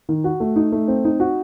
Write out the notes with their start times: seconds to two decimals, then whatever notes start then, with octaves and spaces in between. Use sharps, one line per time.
0.09 D#3
0.24 F#4
0.40 A3
0.56 D#4
0.72 A3
0.88 C4
1.05 D#4
1.20 F#4